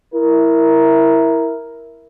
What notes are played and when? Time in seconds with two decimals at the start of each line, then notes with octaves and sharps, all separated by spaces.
0.15 E4 A#4